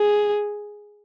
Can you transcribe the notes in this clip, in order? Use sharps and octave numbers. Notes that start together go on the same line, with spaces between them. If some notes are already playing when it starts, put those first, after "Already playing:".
Already playing: G#4